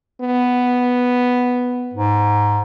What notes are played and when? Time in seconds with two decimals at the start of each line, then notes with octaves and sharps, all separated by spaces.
0.21 B3
1.94 G#2